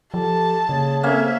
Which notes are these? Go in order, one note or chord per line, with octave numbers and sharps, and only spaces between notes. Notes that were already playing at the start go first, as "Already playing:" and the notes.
F3 G4 A4 A5
C#3 A#3 G#4 C#5
A#3 C4 C#4 A4 C5 E5